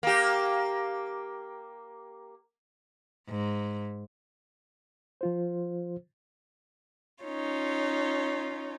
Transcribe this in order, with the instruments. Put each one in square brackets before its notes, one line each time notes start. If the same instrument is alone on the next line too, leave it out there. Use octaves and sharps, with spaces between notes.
[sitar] A#3 G4
[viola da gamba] G#2
[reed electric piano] F3 F4 C5
[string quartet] C#4 D#4 F4 C#5